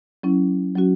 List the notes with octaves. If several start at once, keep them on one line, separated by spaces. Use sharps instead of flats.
F#3 C#4 E4
F#3 C#4 F#4